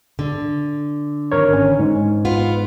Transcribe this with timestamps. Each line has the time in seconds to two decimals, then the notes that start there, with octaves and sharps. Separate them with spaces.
0.19 D3
1.32 G#1 A#4 C#5
1.53 C#4
1.79 G#2
2.25 B3 F4